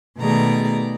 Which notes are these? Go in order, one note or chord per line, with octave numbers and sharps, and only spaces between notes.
B2 D#3 A3 G#4 D5 A#5